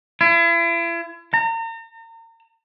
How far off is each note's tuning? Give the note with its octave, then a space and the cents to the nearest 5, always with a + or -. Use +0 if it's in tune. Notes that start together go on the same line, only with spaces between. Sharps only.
E4 +40
A#5 -40